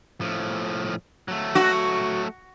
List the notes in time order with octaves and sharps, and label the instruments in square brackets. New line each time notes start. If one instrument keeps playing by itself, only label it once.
[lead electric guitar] A2 F3
F#3 A3
[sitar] F#4